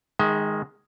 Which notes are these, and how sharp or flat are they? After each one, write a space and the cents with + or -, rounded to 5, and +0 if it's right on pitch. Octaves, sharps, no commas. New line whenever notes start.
D#3 +0 G#3 -5 D#5 +45